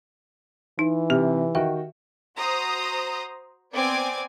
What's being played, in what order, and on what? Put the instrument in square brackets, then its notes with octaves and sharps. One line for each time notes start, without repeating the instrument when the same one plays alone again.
[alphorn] E3 [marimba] D#4
[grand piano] C3 [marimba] G4
[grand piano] D#3 F#4 G5 [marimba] E5
[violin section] F#4 C5 A#5 D#6
B3 C4 D5 G#5 D6 G#6